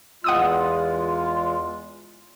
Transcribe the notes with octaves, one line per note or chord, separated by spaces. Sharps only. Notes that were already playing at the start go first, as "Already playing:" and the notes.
E2 G#3 F4 F#5 D#6 E6